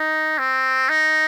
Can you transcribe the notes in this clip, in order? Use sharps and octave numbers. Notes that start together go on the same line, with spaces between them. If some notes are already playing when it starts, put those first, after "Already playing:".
Already playing: D#4
C4
D#4